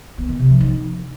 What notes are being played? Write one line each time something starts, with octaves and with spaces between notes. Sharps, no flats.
B3
D#3
C3
F3
D#4